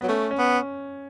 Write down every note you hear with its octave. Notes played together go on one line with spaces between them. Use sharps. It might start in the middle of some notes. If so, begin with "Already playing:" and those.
F#3 B3
A3 C#4
C#4
B3